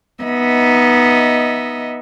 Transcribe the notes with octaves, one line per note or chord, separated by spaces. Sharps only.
B3 D#4 D#5 E5